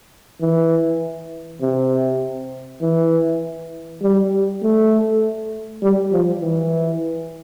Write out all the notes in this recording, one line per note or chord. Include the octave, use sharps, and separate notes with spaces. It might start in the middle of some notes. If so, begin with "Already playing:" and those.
E3
C3
E3
G3
A3
G3
F3
E3